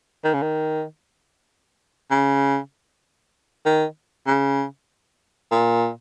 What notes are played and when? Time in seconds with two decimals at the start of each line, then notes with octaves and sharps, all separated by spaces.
0.24 D#3
0.34 C#3
0.42 D#3
2.11 C#3
3.66 D#3
4.27 C#3
5.52 A#2